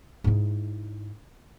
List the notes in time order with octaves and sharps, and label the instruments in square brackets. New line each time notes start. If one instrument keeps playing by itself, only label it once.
[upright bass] G#2 E4